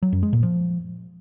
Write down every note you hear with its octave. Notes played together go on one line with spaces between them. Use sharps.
F#3
F#2
G#3
A#2
F3